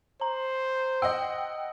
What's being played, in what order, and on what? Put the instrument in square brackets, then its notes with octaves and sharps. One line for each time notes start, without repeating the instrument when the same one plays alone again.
[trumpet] C5 [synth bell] A#5
[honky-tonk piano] D#5 F#5 G5 [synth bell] E6